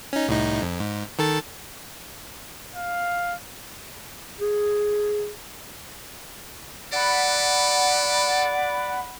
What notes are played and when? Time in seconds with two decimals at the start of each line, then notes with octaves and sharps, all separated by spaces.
0.13 C#4 D#4
0.28 C2 A2 D#4
0.62 F2
0.80 G#2
1.19 D#3 A4 A6
2.75 F5
4.40 G#4
6.93 A4 D5 F#5 B5